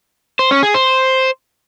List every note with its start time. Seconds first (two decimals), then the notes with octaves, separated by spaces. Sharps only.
0.39 C5
0.51 C#4
0.63 G#4
0.74 C5